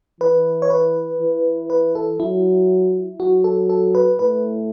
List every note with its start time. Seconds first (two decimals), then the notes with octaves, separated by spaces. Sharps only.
0.21 E3 B4
0.62 C#5
0.70 B4
1.20 E3
1.70 B4
1.95 A4
2.20 F#3 E4
3.20 F#3 F#4
3.44 A4
3.70 A4
3.95 B4
4.19 A2 B4